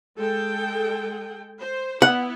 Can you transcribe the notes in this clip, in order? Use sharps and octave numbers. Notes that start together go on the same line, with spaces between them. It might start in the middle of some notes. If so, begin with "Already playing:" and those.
G#3 A4 G5
C5
B3 E4 F#5